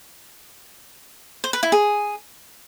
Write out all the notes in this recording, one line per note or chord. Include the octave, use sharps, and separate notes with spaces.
C5
B4
E4
G#4